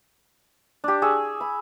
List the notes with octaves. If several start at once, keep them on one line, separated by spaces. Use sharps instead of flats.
D4 G4
G#4 C#6 E6
B5